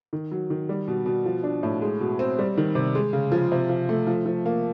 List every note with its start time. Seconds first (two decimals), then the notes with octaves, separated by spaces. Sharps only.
0.13 D#3
0.32 F#3
0.50 D#3
0.69 G3
0.88 B2
1.06 B2
1.25 F3
1.43 D4
1.63 A2
1.82 G#3
2.00 B2
2.19 C4
2.39 G3
2.57 D#3
2.75 C3
2.95 G#3
3.13 C#3
3.32 F3
3.52 C3
3.69 F3
3.89 A3
4.07 F3
4.26 F3
4.46 A#3